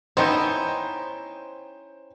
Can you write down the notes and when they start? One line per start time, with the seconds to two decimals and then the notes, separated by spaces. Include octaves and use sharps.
0.17 B3 C#4 D#4 E4 C5 G5 G6